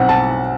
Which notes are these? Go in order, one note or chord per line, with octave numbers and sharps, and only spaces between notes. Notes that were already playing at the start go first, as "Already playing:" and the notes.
Already playing: B1 C4 F#5
A5